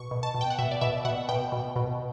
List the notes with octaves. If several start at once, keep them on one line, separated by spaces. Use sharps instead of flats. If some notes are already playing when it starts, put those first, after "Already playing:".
Already playing: B2 C#6
B2
A5
B2
G5
F#5
B2 E5
D5
B2 E5
B2 F#5
B2 G5
B2
B2